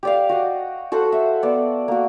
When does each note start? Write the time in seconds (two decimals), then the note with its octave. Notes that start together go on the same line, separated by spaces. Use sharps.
0.03 G4 D5 F5
0.29 F#4 D#5 G5
0.92 F#4 A4 C5 F#5
1.12 E5
1.43 B3 D5
1.88 A#3 F#4